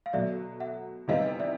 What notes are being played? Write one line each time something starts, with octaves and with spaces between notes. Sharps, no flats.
F5
B2 F#3 A3 D5 E5
E5 F#5
C3 E3 G3 B3 D#4 D#5 F5
D5 E5